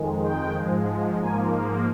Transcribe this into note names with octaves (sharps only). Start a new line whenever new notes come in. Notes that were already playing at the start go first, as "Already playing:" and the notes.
Already playing: F2 D#3 G#3
G5
G#2 F3 G#3
G#2 F3 A#3 G#5